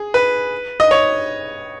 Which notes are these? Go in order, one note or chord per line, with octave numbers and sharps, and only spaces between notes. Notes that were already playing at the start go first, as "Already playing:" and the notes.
Already playing: G#4
B4
D#5
C#5